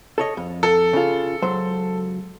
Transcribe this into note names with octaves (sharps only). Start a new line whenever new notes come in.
A4 C#5 D#5
F2
A4
C#3 F4
C#2 F#3 C5